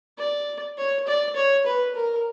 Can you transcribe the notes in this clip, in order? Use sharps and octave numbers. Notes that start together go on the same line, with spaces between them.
D5
C#5
D5
C#5
B4
A#4